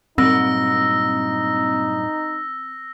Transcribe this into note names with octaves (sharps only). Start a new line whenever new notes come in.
G2 A#2 F#3 C4 D#4 E6 A#6